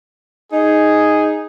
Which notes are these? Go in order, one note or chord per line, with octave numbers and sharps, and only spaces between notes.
D#4 G#4